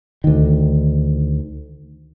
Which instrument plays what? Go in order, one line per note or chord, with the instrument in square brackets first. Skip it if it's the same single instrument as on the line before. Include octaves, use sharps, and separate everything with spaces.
[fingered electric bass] D2 D#3